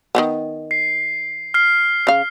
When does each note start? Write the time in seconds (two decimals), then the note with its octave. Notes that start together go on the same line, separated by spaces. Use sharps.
0.15 D#3 G#3 B3
0.71 C7
1.54 F6 C7
2.07 C#3 F5